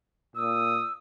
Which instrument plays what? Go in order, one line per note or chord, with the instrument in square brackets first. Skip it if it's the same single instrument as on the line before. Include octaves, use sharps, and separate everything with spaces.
[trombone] A#2 [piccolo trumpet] D#6 [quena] E6